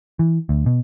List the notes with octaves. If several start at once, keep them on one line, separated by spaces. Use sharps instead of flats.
E3
D2
B2